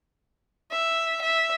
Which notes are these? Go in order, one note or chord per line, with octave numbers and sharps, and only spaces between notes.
E5
E5